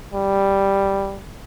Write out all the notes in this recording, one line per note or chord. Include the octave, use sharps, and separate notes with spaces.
G3